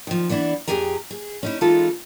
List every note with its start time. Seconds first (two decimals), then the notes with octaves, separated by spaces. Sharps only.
0.07 D#3 F3
0.29 E3 B3 D4 E4
0.68 F2 B2 G4 G#4 G#5 A#5
1.11 G#4
1.43 C#4 D#4 E4
1.61 E3 G#3 B3 D#4 F4 A4